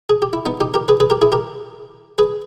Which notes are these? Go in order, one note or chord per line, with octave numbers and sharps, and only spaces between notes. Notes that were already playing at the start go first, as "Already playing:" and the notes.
G#4
G4
E4
B3 D#4
D#4 G4
G4 A#4
G#4 B4
G#4 B4
G4 A#4
E4 G#4
G4 A#4
G#4 B4